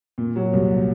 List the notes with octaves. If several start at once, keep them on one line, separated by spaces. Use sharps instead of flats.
A#2
F#3
C2